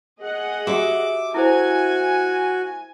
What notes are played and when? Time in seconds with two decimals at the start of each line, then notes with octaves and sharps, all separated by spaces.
0.21 G#4 D#5 F#5
0.67 F#4 G4 E5 D6
1.34 E4 F#4 A4 C5 G#5